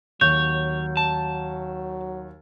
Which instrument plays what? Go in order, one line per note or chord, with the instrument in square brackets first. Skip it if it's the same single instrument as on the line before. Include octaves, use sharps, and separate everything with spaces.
[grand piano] D#2 [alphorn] F#3 [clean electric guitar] C#5 [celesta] G6
[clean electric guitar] A5